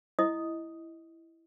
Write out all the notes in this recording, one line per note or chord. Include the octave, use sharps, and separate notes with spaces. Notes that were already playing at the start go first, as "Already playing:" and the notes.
E4 D#5 D#6